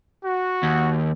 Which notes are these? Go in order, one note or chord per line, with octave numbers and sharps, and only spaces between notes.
F#4
D#2